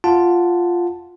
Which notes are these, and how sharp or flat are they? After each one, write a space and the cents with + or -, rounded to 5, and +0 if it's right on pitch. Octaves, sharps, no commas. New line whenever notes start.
F4 +0 F#5 +0 A5 +0